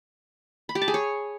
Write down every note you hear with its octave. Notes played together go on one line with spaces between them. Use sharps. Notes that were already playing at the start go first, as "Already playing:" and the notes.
B5
G4
A5
G#4
C#5